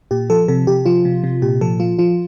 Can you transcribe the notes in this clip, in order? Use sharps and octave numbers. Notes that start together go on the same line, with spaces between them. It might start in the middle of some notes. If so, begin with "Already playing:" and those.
A#2 G4
F3 A4
C3 A4
C3 G4
F3 F4
C3
C3
A#2 G4
F3 A4
F3 F4
F3 F4